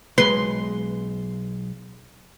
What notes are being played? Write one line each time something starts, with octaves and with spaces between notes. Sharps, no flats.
B1 G#3 B4 C6